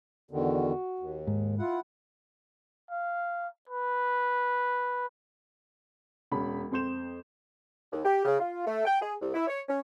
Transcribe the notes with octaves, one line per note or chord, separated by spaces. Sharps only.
E2 D3 D#3 F#4
D#2
G#2
E4 F4 F#5
F5
B4
E1 C#4 B5
F2 C4 C6 G6 E7
D#2
G4
C#3
F4
A3
G5
G#4
C2
E4
C#5
C#4